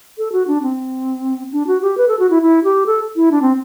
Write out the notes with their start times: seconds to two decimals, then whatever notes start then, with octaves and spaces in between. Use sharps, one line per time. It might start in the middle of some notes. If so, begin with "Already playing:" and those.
0.18 A4
0.32 F#4
0.47 D4
0.63 C4
1.52 D4
1.67 F#4
1.82 G4
1.97 B4
2.08 A4
2.19 F#4
2.30 E4
2.42 E4
2.64 G4
2.86 A4
3.16 E4
3.31 D4
3.42 C4